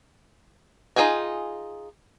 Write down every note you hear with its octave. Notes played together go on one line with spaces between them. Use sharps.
D#4 F4 G#4 G5 G#5